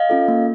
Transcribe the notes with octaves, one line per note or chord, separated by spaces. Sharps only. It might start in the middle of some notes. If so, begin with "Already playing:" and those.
Already playing: D#5 F5
C#4 F4 A4
A#3